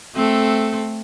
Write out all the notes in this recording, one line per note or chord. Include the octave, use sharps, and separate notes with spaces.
A3 C4 A4